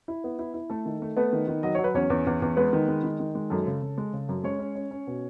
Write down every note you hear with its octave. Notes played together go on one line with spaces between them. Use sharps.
E4
B3
E4
E4
A3 A4
D#3
A3
A3 B3 B4
D#3
D#3
F#3 D#5
F#3 C#5
B4
E2 C#4 C#5
E2
E2
E2
G#3 B3 B4
D#3
G#3
D#3
D#3
G#3
F#2 A4
C#3
C#3
G#3
C#3
F#2
G#3 C#4 C#5
C#4
C#4
C#4
B2